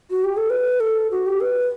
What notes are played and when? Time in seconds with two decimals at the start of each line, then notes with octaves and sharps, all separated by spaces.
0.10 F#4
0.24 G4
0.37 A4
0.50 B4
0.80 A4
1.11 F#4
1.26 G4
1.41 B4